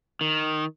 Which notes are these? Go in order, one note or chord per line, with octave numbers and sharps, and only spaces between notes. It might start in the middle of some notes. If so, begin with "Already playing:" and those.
D#3